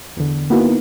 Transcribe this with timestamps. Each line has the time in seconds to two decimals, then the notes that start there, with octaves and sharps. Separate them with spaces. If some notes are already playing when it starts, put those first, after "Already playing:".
0.17 E2 D3
0.50 A#3 B3 D#4 E4 F#4 A#4